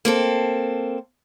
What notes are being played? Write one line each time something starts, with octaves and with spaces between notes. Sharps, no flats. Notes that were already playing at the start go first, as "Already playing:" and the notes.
A#3 C4 A4